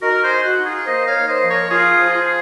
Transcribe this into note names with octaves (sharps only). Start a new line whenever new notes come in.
D#4 F#4 A#4
G#4 C5
D#4
F#4
D#4
F4 G#4
A#3 C5 D#5
C#5 F5
A#3
C5 D#5
F3
A#4 C#5
D#4 F4 G#4
F3
F4 G#4